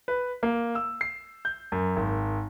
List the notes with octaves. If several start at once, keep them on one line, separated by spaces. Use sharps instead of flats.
B4
A#3
E6
C7
G6
F#2
G#1